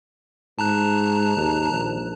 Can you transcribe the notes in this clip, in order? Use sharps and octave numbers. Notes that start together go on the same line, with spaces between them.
G#2 A5 A#5 F#6
D#2
A#1